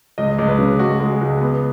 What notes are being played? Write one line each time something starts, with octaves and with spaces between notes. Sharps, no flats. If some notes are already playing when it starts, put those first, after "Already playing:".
C#2 D#5
C#2
B4
C#3
C#2 F#4
G#3
C#2
B3